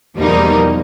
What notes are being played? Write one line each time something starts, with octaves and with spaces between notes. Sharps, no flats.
E2 B2 F3 G3 A#3 D#4